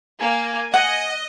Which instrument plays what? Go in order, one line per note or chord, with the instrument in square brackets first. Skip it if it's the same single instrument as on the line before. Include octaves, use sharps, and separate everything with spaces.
[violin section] A#3 [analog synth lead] G#5
[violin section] D#5 [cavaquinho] F#5